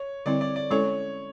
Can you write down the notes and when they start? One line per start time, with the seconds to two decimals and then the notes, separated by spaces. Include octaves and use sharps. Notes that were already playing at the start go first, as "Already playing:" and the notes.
Already playing: C#5
0.26 D3 G3 C4 E4 D5
0.41 D5
0.56 D5
0.71 G#3 C#4 E4 A4 C#5